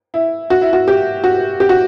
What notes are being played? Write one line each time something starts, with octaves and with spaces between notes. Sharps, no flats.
E4
F#4
E4
F#4
G4
F#4
G4
F#4